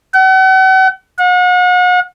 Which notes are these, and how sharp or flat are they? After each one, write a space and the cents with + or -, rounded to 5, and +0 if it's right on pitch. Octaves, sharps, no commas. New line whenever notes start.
F#5 +40
F#5 -40